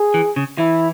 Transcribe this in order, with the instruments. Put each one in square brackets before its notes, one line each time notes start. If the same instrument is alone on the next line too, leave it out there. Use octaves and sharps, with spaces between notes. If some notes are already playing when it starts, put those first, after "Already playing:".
Already playing: [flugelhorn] G#4
[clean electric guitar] E3
C#3
[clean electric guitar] E3 [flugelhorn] E4